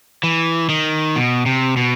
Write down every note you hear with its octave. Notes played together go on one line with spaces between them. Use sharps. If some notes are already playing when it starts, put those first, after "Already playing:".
E3
D#3
B2
C3
B2